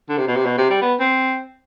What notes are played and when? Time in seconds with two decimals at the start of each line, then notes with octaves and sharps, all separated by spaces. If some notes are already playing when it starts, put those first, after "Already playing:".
0.09 D3
0.17 C3
0.28 B2
0.36 C3
0.45 B2
0.58 C3
0.70 G3
0.82 B3
1.00 C4